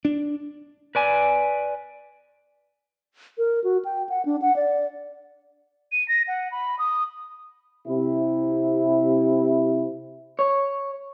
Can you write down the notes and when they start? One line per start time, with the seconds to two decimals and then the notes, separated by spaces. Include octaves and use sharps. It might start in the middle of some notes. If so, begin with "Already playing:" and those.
0.05 D4
0.95 B4 D5 G#5
3.38 A#4
3.64 F#4
3.85 G5
4.09 F#5
4.26 D4
4.42 F#5
4.56 D5
5.92 D#7
6.08 A#6
6.28 F#5
6.52 B5
6.79 D#6
7.88 C3 E4
10.39 C#5